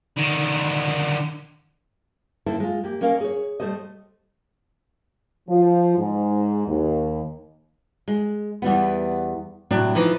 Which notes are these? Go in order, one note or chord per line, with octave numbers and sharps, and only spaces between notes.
D3 D#3
D#3 A#3 E4 A4 C5
G#3 F4
A#3 G4
A#3 C#4 A#4 D#5 F5
G#4 C#5
G3 A3 G#4 C5 D#5
F3
G#2
D#2
G#3
E2 G3 B3
A2 C3 F#3 D4
E3 F3 D#4